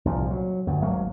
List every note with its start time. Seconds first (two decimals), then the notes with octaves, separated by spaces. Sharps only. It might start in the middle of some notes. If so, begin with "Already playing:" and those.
0.05 C2 A#2 F3
0.31 F#3
0.67 D2 G2
0.82 G#1 F#3 A#3